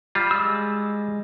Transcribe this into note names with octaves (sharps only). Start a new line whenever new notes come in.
G3 F4
G#3 E6